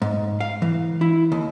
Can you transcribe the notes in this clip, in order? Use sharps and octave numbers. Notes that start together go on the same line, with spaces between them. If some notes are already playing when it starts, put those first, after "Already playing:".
G#2
F5
E3
E4
D#2